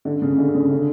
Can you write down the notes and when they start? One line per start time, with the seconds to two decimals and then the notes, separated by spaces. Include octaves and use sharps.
0.05 D3
0.22 C#3
0.38 D3
0.54 C#3
0.70 D3